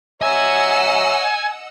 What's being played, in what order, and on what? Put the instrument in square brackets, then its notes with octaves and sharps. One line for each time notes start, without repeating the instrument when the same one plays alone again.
[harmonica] C#5 E5 A#5 [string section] D#5 F#5 E6 [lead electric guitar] G#5